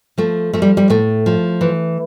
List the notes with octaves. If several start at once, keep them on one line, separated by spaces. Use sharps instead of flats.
F3 A3
F3 A3
G3
G3
A2 A3
F3
E3